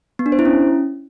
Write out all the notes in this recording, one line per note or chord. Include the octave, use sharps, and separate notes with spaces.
B3
D4
C5
E4
C#4